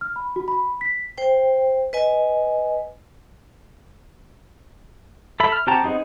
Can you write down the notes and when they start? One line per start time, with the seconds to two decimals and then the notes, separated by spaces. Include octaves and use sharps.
0.01 F6
0.16 B5
0.36 F#4
0.48 B5
0.81 B6
1.18 C5 G5
1.93 B4 D#5 G#5
5.40 A4 E5 B5
5.52 F6
5.67 C4 F#4 G4 A5 A#5
5.83 B3 C4 D#4 G#4